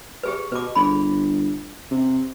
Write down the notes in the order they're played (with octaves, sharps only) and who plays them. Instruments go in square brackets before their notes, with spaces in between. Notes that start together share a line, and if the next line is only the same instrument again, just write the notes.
[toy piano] G4 G#4 B4
[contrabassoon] B2 [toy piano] B4 D6
[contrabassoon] G1 [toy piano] G#4 B5
[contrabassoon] C3